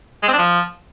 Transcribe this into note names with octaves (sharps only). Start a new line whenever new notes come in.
G#3
C4
D4
F3